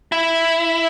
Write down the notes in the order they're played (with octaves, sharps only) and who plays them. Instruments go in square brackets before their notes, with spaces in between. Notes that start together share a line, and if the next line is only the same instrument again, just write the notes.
[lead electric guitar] E4